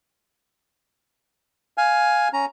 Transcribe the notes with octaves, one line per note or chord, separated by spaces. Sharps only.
F5 G#5
C#4 A#5